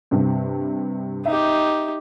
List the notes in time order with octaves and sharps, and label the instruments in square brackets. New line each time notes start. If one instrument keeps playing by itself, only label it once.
[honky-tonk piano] G2 C3
[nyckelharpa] D#4 G4 [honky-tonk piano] E5